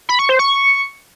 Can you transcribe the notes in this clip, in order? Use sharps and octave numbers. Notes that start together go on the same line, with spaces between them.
B5
C#6
C5
C#6